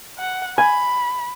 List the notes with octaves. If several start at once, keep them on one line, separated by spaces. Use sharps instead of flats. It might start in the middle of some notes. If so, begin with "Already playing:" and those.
F#5
G#5 B5